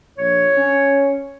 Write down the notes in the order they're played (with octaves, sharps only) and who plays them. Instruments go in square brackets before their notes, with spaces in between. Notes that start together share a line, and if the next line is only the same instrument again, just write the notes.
[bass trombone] A#1 [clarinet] C#5
[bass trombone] C#4